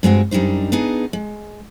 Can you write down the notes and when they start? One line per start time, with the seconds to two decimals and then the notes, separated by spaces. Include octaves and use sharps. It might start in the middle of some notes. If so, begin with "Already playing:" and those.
0.03 G2 G#3 C4 F#4
0.31 F#2 G3 D4 D#4 C5
0.72 B3 D4 D#4 G#4
1.13 G#3